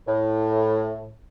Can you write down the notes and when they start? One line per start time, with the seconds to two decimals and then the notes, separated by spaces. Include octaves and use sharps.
0.07 A2